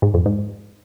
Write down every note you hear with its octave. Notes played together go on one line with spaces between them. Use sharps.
G#2
F2
G#2